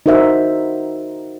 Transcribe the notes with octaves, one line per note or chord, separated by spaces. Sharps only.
D#4 F#4 A#4 C5 E5